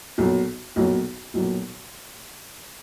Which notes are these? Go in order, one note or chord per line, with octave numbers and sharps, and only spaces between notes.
B1 A#2 F#3
B1 A#2 F#3
B1 A#2 F#3